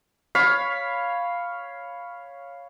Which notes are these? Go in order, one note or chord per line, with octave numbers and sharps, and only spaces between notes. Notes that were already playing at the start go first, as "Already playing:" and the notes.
C#5 F5 B5